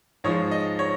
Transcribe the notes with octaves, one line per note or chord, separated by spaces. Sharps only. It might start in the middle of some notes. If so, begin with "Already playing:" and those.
G#2 F3 G#3 C#5
D#5
C#5